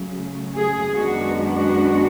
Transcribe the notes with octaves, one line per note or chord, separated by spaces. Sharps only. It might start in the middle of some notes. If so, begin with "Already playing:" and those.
Already playing: C#3 F#3 A3
G#4
F#2 D#3 G#3 B3 D4 F#4
F#4